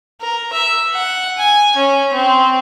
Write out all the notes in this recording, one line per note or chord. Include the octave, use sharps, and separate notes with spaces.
A#4
E5
F#5
G#5
C#4
C4